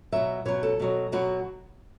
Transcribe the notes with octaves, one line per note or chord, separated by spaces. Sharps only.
B2 F#3 E5
B2 F#3 C#5
A4
B2 F#3
B2 F#3 F#4